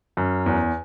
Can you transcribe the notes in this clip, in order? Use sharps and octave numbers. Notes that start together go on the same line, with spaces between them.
F#2
E2